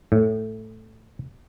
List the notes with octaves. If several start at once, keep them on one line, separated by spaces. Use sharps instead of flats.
A2